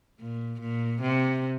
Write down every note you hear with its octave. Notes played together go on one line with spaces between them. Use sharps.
A#2
A#2
C3